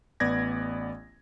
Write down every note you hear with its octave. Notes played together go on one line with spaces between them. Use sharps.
A1 B3 D5 G#6 A#6